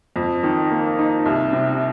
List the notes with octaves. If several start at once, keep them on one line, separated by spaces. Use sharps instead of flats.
F2
D#3
A#3
D#4
C2
C3